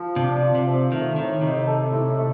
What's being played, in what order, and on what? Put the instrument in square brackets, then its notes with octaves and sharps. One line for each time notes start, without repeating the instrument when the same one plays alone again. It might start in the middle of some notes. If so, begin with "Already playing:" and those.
Already playing: [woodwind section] F3
[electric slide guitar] C3 [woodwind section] D4
[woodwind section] F3
[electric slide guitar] C3
[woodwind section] F3
[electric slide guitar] D#3 [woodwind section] A3
[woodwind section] A2 [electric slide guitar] D#3
[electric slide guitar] C3 [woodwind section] D#4
[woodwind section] A4
A2
A3